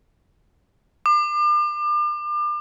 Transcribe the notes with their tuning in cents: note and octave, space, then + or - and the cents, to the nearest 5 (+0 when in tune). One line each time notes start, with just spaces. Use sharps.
D6 +35